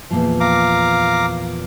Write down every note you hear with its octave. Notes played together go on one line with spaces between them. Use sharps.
E2 A#2 F3
F5 A#5 D6